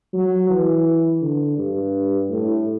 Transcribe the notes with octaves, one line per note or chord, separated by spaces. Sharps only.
F#3
E3
D3
G2
A2